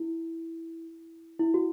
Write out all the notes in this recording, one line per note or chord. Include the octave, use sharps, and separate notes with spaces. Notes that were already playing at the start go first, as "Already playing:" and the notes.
Already playing: E4
E4
F#4